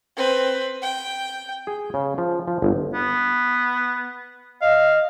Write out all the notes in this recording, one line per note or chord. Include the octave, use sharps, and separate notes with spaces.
C4 B4
G5
G#4
C#3
F3
F3
G1
B3
D#5 F5